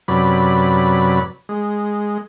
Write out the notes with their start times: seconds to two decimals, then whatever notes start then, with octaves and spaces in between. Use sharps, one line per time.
0.08 F#2 C3 F#3 B4 D5 B5
1.49 G#3